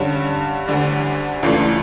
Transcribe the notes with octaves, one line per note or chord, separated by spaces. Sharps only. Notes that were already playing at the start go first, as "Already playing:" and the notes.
Already playing: G2 D3 G3 C#4
D2 D3 G3 D4
C#2 C#3 E3 A3 D4